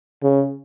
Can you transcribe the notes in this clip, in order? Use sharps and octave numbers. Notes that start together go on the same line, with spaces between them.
C#3